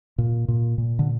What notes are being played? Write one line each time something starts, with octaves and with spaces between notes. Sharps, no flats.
A#2
A#2
A#2
D3